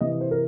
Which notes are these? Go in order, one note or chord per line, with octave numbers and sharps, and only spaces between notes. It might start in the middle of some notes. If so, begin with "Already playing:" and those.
C3 E3 D#5
C5
A#4